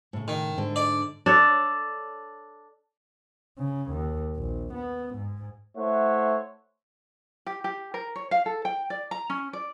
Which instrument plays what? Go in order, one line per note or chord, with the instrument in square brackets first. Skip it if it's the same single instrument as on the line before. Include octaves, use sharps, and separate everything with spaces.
[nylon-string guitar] A2 C#3
[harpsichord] D#3
[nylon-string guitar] G#2 D3
[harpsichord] D5
[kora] D4 A4 C#5
[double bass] C#3
D#2
A#1
B3
G#2
[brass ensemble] A3 E4 C5 C#5 E5 F#5
[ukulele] G4
G4
A#4
C#5
F5
A4
G5
D5
A#5
C#4
D5